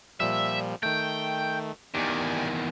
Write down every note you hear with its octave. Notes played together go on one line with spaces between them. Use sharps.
A#2 F3 G3 E5
D#3 A3 G5
E2 D#3 G4 D5 G#5